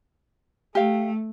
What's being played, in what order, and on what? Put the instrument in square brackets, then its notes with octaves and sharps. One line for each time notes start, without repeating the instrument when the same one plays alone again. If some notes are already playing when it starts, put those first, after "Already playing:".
[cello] A3 [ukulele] G4 F5